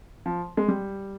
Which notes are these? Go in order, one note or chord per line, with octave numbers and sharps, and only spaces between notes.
F3
G#3
G3